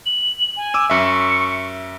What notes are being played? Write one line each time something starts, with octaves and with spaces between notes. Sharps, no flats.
F#7
G#5
D6 E6 D#7
F#2 E5 C#6